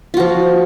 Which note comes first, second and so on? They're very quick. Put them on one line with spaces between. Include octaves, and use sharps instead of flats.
F4 F#4 F3